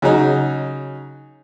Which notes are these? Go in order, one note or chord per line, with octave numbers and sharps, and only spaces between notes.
C#3 F#3 D#4